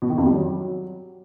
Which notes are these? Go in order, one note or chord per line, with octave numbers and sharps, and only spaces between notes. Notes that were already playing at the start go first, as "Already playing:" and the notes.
B2
D#3
F2
G3
F#3